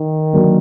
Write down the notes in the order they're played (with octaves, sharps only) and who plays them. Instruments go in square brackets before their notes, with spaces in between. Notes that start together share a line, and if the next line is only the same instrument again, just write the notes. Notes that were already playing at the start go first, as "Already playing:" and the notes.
Already playing: [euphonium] D#3
[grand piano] D3 F#3 A#3 D4